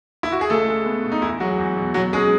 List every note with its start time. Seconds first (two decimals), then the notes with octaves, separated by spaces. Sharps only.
0.23 E4
0.32 F#4
0.41 G#4
0.49 C#2 A3 A4
0.68 G#3
0.86 B3
1.04 B2
1.12 D#4
1.22 E2 E4
1.40 F#3 G#3 F#4
1.58 E2
1.77 B2
1.94 B2 F#3 F#4
2.13 G#3 C#4 G#4